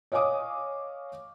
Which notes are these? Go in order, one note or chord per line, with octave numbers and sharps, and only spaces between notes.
C#5 D#5 F5 G#5 D6 D#6